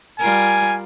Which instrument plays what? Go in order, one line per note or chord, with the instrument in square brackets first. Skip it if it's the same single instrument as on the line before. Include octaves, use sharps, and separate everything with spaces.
[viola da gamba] G3 F4 A#4 [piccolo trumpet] G#5